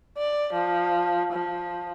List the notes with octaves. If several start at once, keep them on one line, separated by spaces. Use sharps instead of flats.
D5
F3
F3